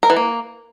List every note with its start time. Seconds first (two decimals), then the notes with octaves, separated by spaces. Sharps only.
0.03 A#4
0.10 E3
0.16 A#3